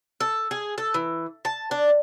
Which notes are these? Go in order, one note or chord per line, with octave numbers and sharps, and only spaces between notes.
A4
G#4
A4
E3
A5
D4